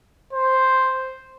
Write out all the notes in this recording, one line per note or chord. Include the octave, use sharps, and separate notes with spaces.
C5